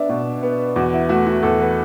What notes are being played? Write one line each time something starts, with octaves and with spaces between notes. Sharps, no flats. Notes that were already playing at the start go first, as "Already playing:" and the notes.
Already playing: B3 D4 D5 E5
B2
B3
E2 F#4
E4
A3 F#4
F#4
E2 A4
B4